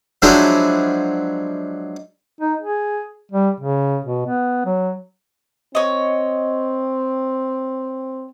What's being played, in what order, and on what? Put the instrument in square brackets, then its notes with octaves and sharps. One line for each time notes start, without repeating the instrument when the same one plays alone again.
[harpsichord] F3 F#3 G#3 D4 E4
[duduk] D#4
G#4
G3
C#3
B2
B3
F#3
[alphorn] C4 [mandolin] C#5 D#5